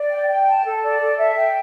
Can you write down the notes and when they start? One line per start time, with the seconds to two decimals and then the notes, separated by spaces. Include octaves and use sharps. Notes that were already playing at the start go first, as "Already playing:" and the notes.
Already playing: D5
0.10 G5
0.28 G5
0.47 A5
0.65 A4
0.83 D5
1.00 A4
1.17 E5
1.36 G5